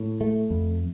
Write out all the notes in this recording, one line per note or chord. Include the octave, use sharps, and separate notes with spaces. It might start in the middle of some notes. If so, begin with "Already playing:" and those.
Already playing: A2
A3
F2